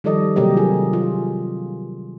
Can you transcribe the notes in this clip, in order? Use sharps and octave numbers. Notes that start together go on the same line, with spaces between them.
D#3 F3 G3 A4 D5 D#5
C3 F#3 A#3 G4 A#4 D#5
F4 G#4
F4